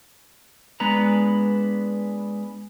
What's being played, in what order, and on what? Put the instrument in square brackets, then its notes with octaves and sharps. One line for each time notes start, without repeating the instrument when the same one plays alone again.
[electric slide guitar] G#3 B3 D4 B4 A#5